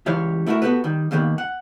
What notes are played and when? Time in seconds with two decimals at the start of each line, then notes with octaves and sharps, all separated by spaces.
0.06 C#2 E3 G3 C#5 F5 C6
0.46 A3 E4 F#4 A#4 E5
0.62 B3 D4 F#4 G4 A4 B4
0.84 D#3 G3
1.11 D#2 B2 D#3 G3 A3 A#3
1.38 F#5